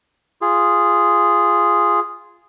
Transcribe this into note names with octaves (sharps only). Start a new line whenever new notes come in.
F4 G#4